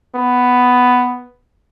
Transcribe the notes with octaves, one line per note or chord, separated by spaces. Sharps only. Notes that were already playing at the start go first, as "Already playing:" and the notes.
B3